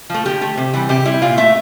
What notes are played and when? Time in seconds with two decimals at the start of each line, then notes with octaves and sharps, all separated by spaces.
0.10 F3 A3
0.25 D3 G4
0.42 A3
0.57 C3
0.74 E3 G3
0.89 C3 G4
1.05 G3 E4
1.22 A#2 F4
1.37 A3 E5